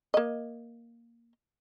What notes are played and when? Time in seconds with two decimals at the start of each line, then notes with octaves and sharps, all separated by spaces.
0.14 A#3 D#5